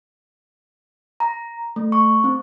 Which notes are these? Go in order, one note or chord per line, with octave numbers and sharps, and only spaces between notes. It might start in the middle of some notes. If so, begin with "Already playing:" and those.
A#5
A3
C#6
C4